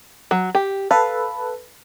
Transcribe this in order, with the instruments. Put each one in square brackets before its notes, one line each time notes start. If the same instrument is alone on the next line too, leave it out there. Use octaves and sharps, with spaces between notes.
[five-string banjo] F#3
G4
[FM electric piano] A4 B4 [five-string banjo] F5